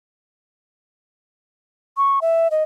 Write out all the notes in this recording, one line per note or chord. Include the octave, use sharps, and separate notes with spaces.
C#6
E5
D#5